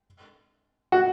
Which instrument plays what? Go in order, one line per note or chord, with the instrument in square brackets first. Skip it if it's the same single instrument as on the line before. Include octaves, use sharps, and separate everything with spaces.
[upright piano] F#4